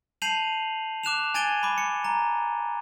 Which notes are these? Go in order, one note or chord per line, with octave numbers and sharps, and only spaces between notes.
A5 G6 C7 D#7 F7 F#7
D6 F#6 E7 F7
G#5 G#6 A6 D7 D#7 G7
B5 D6
C#7
A#5